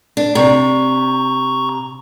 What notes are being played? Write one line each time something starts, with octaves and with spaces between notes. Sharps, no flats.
D4
C3 A#5 C#6